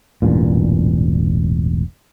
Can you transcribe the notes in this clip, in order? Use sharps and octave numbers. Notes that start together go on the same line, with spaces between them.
E1 A1 G2 A#2